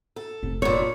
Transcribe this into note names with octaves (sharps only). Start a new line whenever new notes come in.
A4
F1 D#4
G2 A#2 C#5